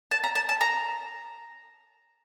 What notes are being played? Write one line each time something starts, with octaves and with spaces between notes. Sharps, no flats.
A5
A#5
A5
A5
A#5